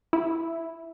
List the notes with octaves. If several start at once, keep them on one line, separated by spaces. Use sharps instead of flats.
E4